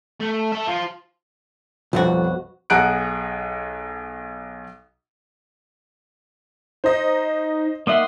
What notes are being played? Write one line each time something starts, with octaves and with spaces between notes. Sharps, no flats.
A3
A4 E5
F4 C5
B1 F2 F3 G3 F#4
B1 G#4 F#5 A#5 F#6 D7
D#4 C5 D#5
A#3 D#4 D#5 E5 F#5 C6